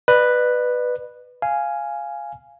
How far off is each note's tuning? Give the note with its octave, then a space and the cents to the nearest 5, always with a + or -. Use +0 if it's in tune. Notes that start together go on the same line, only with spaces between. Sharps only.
B4 +0 D5 +40
F5 -10 G#5 +0